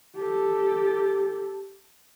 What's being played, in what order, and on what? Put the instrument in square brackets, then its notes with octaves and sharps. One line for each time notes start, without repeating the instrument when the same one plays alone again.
[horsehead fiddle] G4 A4